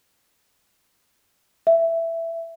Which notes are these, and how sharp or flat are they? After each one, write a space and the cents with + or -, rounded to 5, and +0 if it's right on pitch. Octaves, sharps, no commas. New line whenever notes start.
E5 +10